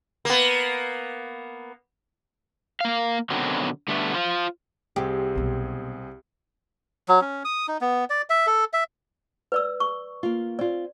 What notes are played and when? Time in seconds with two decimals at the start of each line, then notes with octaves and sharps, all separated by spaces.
0.25 A#3 B3
2.81 A#3 F5
3.30 B2 D3 D#3 F#3 C4
3.88 D3 G3 A3 B3
4.14 F4 C5
4.96 C2 C4 G4 G#4
5.35 B1 B3
7.09 F#3
7.22 C#4
7.45 D#6
7.68 D#4
7.81 B3
8.10 D5
8.30 E5
8.47 A4
8.73 E5
9.52 B4 D5 E6
9.80 C#6
10.23 A#3 F4
10.59 C4 F4 D5